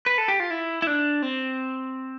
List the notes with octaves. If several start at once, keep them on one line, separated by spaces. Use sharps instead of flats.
B4
A4
G4
F4
E4
E4
D4
C4